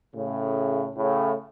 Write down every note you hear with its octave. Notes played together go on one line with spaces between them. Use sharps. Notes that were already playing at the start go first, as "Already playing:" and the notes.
A2 C#3
A2 C#3